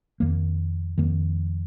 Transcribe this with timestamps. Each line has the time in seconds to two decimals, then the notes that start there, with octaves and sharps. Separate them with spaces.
0.20 F2 D#3 A#3
0.98 F2 D#3 A#3